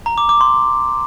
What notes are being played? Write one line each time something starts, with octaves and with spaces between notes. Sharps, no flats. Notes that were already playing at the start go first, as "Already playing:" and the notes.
A#5
D6
D6
C6